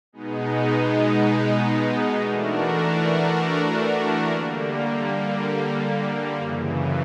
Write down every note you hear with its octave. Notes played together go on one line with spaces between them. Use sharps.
B2 G#3 B3 D#4
E3 A3 D4 F#4 A#4
D3 G3 A#3
F#2 C#3 E3